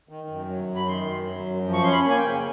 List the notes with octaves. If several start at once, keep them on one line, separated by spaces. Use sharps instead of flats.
D#3
F#2
F#3
F#2
B5
D#3 C6
F#2
F#3
F#2
F3
C#6
C#4 C6
B5
A#3
G#5
G5
C#3